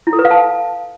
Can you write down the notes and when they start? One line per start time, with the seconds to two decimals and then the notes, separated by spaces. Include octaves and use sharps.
0.07 E4
0.13 A4
0.19 B4
0.25 F5
0.31 A5